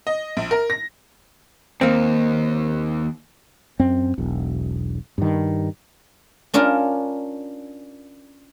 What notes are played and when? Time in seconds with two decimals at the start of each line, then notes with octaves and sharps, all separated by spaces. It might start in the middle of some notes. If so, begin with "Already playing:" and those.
0.07 D#5
0.37 A#1
0.51 A#4
0.70 A#6
1.81 D#2 A#3 C4
3.79 F#2 C4
4.18 E1 B1
5.18 G2 D#3
6.54 C#4 D4 F4 A#4